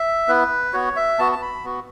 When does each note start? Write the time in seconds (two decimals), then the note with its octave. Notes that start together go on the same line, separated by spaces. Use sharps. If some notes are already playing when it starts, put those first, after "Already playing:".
Already playing: E5
0.28 B3 E4 B4
0.74 B3 F#4 C#5
0.96 E5
1.19 B3 F#4 A5
1.32 A5
1.42 B5
1.64 B3 F#4